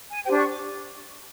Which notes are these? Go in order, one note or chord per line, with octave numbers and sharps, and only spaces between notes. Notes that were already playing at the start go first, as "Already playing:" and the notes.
G#5
D4 G4 C5 G5
C#6
D6